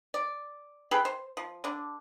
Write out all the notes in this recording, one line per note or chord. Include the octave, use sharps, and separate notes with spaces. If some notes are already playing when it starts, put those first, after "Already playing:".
D5
G#4 A4 B4 G5
C5
F3
D3 D4